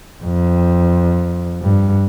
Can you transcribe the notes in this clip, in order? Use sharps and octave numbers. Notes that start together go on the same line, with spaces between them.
F2
G2